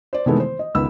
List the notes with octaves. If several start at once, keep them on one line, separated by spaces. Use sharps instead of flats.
C5 D5
C3 D#3 E3 G#3 A3 B3
C5
D#5
C#2 D#3 B3 B5 E6